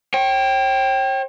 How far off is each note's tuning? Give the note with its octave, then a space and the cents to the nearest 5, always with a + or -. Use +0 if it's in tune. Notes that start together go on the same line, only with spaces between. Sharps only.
C#5 -45 G5 -10